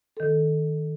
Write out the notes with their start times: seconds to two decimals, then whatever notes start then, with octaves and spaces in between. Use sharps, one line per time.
0.17 D#3 A4